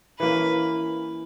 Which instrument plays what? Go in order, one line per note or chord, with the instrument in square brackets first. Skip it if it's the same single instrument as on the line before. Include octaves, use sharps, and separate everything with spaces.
[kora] E3 A#3 C#4 [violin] B4